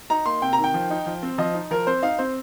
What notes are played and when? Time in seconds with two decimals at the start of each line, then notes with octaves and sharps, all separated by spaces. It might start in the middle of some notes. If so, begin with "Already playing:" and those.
0.10 D#4 A#5
0.26 A#3 C6
0.42 C3 G5
0.53 A#5
0.59 D#3
0.64 G5
0.74 F3
0.90 D#4
1.06 F3
1.23 C4
1.38 F3 D#5
1.54 D#4
1.71 F3 A#4
1.87 C4 C5
2.03 D#4 F5
2.18 C4 C5